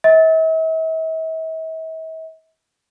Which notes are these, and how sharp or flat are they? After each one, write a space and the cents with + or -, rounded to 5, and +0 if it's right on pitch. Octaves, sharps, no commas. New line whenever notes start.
E5 -45